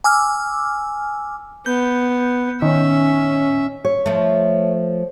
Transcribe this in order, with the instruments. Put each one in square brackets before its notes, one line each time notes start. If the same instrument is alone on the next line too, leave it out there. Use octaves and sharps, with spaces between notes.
[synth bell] G#5 D6 E6 F6
[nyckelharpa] B3 [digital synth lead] G6
[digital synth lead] D#3 [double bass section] C#4 [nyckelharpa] E5
[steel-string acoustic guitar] C#5
[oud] F3 A3